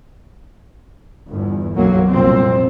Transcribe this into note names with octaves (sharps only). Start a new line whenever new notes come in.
G1 E2
B1 F#2 F#3 A#3
C2 F2 A#2 F3 C4